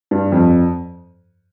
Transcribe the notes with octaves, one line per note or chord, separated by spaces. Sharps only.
G2
F2